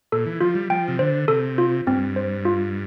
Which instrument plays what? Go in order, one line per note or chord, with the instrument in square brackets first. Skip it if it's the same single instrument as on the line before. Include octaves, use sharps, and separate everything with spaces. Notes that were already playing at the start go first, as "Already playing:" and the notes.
[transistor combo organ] A#2 [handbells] A4
[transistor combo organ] E3
[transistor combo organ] F3 [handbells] F4
[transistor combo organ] G3
[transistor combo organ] F3 [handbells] G5
[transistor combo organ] C3
[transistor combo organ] D3 [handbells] C5
[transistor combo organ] C3 [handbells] A4
[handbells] F4
[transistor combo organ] G2 [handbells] C4
[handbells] C5
F4